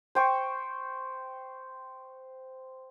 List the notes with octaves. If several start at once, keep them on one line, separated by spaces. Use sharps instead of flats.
C5 G5 C#6